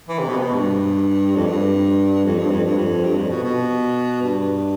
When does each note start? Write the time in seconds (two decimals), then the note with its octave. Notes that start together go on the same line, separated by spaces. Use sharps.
0.09 E3
0.19 C3
0.28 B2
0.36 C3
0.41 B2
0.54 G2
1.35 F2
1.47 G2
2.25 F2
2.38 G2
2.51 F2
2.64 G2
2.77 F2
3.04 G2
3.17 F2
3.30 B2
3.43 B2
4.22 G2